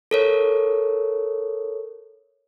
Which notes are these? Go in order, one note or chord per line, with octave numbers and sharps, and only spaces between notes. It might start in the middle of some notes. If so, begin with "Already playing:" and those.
A4 A#4 C#5